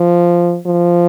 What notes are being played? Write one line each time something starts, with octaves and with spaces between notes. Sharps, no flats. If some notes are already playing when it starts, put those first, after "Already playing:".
Already playing: F3
F3